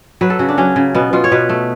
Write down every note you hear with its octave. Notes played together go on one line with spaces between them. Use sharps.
F#3 B4
A4
C#3 F#4
D4
F#3 C#4
C#3
B2 B3
B2 F4
C#5
B2 B4
A3